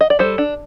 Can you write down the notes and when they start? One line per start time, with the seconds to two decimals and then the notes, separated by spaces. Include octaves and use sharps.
0.01 D#5
0.10 D5
0.19 G3 A4 C5
0.38 D4